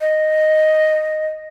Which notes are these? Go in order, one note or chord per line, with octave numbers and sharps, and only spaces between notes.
D#5